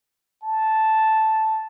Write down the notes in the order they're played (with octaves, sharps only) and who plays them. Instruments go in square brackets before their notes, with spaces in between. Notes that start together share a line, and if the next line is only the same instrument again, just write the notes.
[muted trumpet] A5